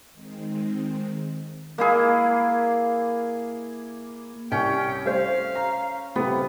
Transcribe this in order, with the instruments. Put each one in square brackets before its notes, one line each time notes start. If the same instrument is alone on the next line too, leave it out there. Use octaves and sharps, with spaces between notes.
[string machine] D#3 G#3 C4
[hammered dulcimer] A#3 E4 G#4
[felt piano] C2 [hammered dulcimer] C#4 [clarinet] G5
[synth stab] G3 A3 C5 [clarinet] F5
[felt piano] A#5
[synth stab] G2 A#2 C#3 [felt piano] A3 C4 G4 [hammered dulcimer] B3